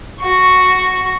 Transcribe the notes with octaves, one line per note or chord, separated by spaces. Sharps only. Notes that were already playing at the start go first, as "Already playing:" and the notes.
F#4 C#6